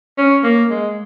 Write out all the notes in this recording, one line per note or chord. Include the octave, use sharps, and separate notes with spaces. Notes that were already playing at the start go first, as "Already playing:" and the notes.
C#4
A#3
G#3